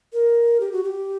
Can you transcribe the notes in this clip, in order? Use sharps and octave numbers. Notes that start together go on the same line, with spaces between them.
A#4
G4
F#4
G4